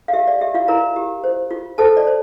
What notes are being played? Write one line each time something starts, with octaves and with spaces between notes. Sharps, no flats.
F5
G4 E5
D5
G4 E5
F4 F5
E4 A#4 A#5
G4
C5
F4
A4 C5 A5
D5
C5